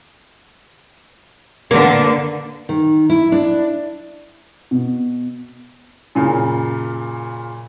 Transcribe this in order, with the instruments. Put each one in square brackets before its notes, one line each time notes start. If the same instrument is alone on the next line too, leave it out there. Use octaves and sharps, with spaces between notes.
[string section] D3 [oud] A#3 B3
[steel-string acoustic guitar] D#3
E4
D4
[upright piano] B2
[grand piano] F#2 A#2 C#3